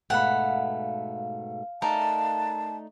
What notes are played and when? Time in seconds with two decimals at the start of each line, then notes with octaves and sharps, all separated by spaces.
0.10 G#2 B2 A3 F5 F#5 B5
1.82 A3 D#4 A#4 D5 A5